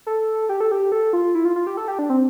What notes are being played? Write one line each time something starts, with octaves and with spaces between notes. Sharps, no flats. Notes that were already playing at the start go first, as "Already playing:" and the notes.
A4
G4
A4
G4
A4
F4
E4
F4
F4
G4
A4
G4
D4
C4